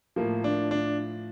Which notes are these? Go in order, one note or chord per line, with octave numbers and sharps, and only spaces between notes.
A2 F3 A#3
D4
D4